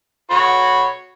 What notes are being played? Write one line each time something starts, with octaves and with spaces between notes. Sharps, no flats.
F#4 C#5 B5